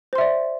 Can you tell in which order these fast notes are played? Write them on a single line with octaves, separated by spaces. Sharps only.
C5 C6 E5 D5